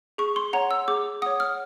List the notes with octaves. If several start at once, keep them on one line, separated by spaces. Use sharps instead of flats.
G#4 C#6
C6
C#5 F#5 A#5
E6
G#4 D6
C#5 F#5 D#6
F6